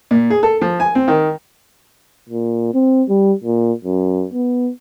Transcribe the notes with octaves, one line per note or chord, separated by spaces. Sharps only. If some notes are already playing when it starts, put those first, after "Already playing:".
A#2
G#4
A4
F3
G#5
C4
D#3
A#2
C4
G3
A#2
F#2
B3